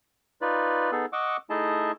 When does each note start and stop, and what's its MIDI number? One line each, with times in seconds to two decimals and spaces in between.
0.41 0.91 63
0.41 0.91 65
0.41 0.91 71
0.41 0.91 74
0.92 1.06 59
0.92 1.06 63
0.92 1.06 68
0.92 1.06 69
1.13 1.37 75
1.13 1.37 78
1.13 1.37 85
1.13 1.37 86
1.13 1.37 88
1.50 1.92 57
1.50 1.92 63
1.50 1.92 64
1.50 1.92 68
1.50 1.92 75
1.50 1.92 81